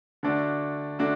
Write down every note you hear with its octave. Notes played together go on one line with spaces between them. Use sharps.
D3 A3 D4 F#4
D3 A3 D4 F#4